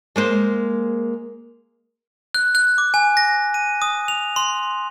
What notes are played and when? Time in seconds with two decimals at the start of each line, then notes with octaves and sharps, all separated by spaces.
0.16 G#3 A#3 C5
2.35 F#6
2.55 F#6
2.78 D6
2.94 G#5
3.17 A#6
3.54 D#7
3.82 D#6
4.08 F7
4.36 C6